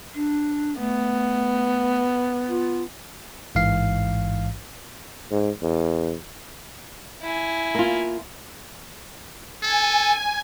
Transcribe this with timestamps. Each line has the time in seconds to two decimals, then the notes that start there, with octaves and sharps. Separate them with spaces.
0.14 D4
0.79 A3 B3
2.48 F4
3.55 A1 G#2 E3 F5 C7
5.31 G#2
5.62 E2
7.22 E4 G#5
7.75 A#3 F4
9.63 A4 G#5